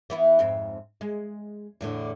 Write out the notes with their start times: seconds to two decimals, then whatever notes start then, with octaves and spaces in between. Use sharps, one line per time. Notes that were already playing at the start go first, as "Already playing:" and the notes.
0.10 E3 B3 E4
0.39 F2 G#2 C4
1.01 G#3
1.81 E2 A2 D3